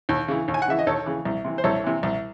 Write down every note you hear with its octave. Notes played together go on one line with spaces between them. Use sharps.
D#2
C#3 E3
D#2
G#5
F#5
C#3 E3 E5
D#5
D#2 A4 C#5
C#3 E3
C2
C3 E3
C5
C2 A4 C#5
C3 E3
C2